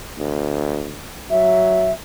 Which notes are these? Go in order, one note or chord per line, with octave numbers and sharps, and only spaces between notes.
D2
F#3 E5